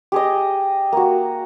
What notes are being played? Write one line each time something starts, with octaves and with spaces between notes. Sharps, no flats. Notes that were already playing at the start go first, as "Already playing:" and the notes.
G4 G#4 D#5
A#3 F#4